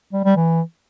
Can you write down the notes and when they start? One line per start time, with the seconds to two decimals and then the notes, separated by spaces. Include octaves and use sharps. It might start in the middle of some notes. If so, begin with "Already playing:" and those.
0.13 G3
0.25 G3
0.36 E3